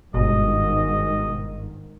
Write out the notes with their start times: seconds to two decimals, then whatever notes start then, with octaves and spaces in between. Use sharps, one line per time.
0.14 G1 G#2 B2 D#3 D#5